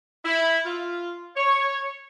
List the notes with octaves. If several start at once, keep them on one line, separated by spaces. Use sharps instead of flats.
E4
F4
C#5